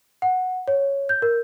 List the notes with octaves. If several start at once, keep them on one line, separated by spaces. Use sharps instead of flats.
F#5
C#5
G6
A#4